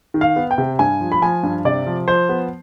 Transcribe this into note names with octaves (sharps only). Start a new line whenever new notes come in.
D#3
F5
B3
G5
C3
G2 G#5
F3
B5
F3 G#5
G2
C3 D5
F3
F3 C5
B3